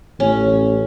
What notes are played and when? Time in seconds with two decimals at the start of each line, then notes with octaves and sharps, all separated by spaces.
0.20 A1 C#4